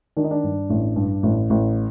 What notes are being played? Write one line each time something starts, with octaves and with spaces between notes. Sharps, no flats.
D#3 D4
D#4
D4
G2
A1
G2
A1
A1